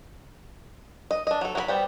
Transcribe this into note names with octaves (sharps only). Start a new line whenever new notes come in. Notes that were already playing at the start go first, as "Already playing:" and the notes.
D#5
D4 D#5
F#3 A4
F#3 A#4 B5
G3 B3 C4